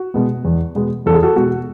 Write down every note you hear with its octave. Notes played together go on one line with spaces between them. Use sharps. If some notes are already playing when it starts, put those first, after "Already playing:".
Already playing: F#4
B2 G#3 B3
E2
B2 G#3 B3
E2 A4
G#4
F#4 A4
B2 G#3 B3 F#4